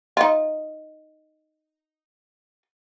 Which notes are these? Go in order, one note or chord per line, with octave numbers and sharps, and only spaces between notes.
D#4 F4